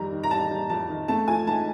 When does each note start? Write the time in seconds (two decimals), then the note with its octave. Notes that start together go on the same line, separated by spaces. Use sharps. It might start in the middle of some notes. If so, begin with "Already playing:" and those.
Already playing: F2 D#3 G3 A#5
0.12 D#3
0.23 A#5
0.31 G3 A5
0.51 G3
0.69 F2 A5
0.89 D#3
1.08 A3 A5
1.28 F3 G#5
1.47 G#2 A5